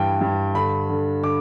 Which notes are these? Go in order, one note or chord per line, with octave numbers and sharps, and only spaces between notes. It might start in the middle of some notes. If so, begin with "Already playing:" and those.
Already playing: G2 E3 G5
G2
D3 B5
D3
D3 D6